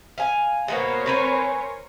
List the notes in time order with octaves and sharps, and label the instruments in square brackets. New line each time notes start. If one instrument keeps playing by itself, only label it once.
[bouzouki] F5 G#5
[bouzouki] B2 A#3 B3 [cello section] A#4 C5 C#5
[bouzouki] C4 B4 G#5